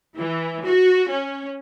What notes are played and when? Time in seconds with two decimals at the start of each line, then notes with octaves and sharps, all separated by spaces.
0.17 E3
0.64 F#4
1.10 C#4